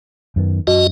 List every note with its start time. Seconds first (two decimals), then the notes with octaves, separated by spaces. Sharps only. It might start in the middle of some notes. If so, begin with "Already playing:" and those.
0.36 F#2 D#3 B3
0.67 F#2 F#4 D#5